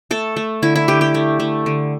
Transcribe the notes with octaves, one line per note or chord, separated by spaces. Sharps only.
A3 A4
A3
D3 E4
E4
D3 G4
G4
A3
A3
D3